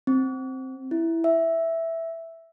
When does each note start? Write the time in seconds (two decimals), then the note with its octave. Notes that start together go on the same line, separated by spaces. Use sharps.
0.07 C4
0.91 E4
1.24 E5